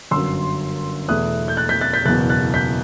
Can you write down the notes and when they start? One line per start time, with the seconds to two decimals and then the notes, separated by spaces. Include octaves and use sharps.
0.11 G1 F#2 F#3 C6 E6
1.08 E2 B2 A3 E4 D#6 F#6
1.48 G6
1.57 F#6 A6
1.69 G6 B6
1.81 F#6 A6
1.93 G6 B6
2.06 F#1 E2 B2 F#6 A6
2.30 F#6 A6
2.54 G6 B6